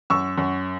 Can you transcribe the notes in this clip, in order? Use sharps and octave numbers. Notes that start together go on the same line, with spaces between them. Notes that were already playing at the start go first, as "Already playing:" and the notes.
F#2 C#6 E6
F#2